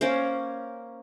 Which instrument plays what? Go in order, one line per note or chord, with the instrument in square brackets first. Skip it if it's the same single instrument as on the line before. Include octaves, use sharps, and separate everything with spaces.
[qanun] A#3 C#4 A#4 C5